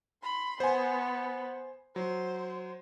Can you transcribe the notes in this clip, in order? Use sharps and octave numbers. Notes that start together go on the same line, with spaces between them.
B5 C6
B3 C5 G#5
F#3 C5